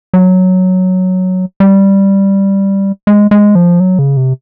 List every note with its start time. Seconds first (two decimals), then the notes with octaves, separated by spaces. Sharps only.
0.13 F#3
1.60 G3
3.07 G#3
3.31 G#3
3.55 F3
3.80 F#3
3.99 C#3
4.17 C3